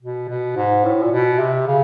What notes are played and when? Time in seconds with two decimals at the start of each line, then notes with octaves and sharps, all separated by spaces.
0.01 B2
0.29 B2
0.56 G#2
0.84 A2
1.02 A#2
1.12 B2
1.39 C3
1.67 C#3